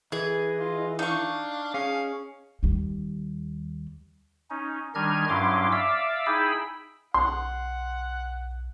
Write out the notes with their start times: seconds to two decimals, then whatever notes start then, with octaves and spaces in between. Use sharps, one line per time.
0.12 E3 G#4 D#5
0.59 F4
0.99 D4 D#4 F5 C#6
1.74 C#4 G#4 F5
2.63 D#2 G3
4.50 C#4 D#4
4.95 D#3 G3 D4 D#5 F6 G#6
5.29 G2 F#3 C#4 E4 C6 D6
5.72 D5 E5 F5 D6 E6
6.26 D#4 E4 G#4 G5 B5 E6
7.14 B1 F#5 C6